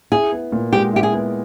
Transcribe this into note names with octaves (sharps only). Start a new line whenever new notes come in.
E4 G#4
B3
A#2
G#3 G4
E4 G4
G#4
B3